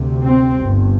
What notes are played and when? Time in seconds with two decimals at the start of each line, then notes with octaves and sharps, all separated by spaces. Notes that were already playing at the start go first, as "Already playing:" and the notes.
Already playing: D2 C3
0.23 C4
0.58 G1 G2